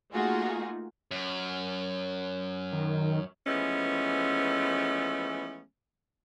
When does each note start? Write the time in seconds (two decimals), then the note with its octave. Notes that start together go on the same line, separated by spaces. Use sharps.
0.13 A3 A#3 D#4 F4 F#4 G#4
1.11 F#2
2.73 D#3
3.47 E3 F3 G#3 A3 B3 C#4